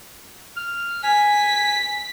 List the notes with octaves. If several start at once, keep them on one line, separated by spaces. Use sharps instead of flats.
F6
G#5 B6